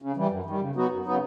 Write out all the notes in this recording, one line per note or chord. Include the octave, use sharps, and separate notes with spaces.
C#3
E3 G3
F#2
D#3 G3
C#3
F#3 B3 D#4 F#4
F#2
C#3 F#3 B3 D#4